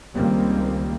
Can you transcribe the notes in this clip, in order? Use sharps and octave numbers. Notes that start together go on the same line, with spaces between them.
C#2 D#3 G3 A#3 C4